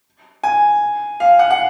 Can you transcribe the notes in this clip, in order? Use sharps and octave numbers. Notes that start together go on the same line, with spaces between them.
G#5
F5
F#5
F#5